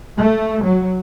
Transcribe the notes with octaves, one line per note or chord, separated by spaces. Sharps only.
A3
F#3